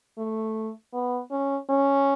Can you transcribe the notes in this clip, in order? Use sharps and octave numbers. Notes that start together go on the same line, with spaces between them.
A3
B3
C#4
C#4